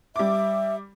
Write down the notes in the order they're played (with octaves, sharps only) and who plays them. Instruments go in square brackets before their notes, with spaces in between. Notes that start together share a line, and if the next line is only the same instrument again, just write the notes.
[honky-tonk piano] G3 D6 [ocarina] E5